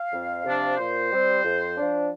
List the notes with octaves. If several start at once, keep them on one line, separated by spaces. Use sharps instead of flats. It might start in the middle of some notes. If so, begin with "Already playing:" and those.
Already playing: F5
F2
C3 F3 D4
A#2 C5
G3 C4
F2
F3 D4